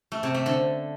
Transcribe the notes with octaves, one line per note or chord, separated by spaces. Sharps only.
A3
C3
A3
D3